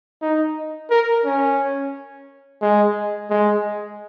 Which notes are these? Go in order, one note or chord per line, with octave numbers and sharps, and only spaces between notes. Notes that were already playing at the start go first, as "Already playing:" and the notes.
D#4
A#4
C#4
G#3
G#3